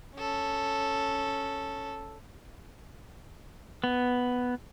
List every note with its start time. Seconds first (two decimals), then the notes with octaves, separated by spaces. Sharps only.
0.17 C#4 A4
3.84 B3